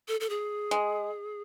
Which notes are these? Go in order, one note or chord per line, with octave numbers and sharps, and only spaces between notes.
A4
A4
G#4
G#3